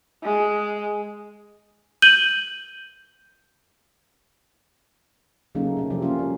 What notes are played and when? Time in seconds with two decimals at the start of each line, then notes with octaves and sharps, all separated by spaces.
0.23 G#3
2.02 G6 D#7 F#7 G7
5.55 C#3 F#3 A3 A#3 C#4 D#4
5.77 C3 A3
5.90 C3 F3 G3 G4
6.02 A#3 C#4 F4
6.19 G3